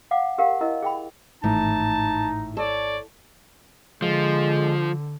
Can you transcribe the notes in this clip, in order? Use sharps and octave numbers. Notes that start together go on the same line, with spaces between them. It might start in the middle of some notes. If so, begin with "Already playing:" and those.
F5 F#5 D6
G4 A#4 F5 F#5
E4 A#4 D#5
G#4 G5 B5
G#1 A2 E3 A3 D#4 A5
A4 C#5 D5
D3 F3 G#3